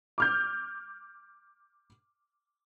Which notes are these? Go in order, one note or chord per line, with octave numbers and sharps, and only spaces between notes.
D6 F6 G6